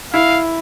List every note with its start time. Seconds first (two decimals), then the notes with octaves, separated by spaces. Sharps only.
0.13 E4 F5